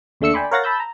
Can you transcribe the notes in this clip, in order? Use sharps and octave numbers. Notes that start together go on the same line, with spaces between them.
D#2 D3 A3 E6 C#7
D5 G5 G#5 B5 C6 D6
A#4 C#5 F5 F#5 A6 A#6
A5 B5 E6 G6
A#5